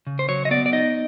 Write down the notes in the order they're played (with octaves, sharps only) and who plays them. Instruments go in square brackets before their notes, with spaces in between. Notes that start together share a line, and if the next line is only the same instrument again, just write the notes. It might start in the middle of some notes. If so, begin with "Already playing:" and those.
[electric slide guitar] C#3
C5
F#3 C#5
D#5
B3 D5
D5
D#4 D#5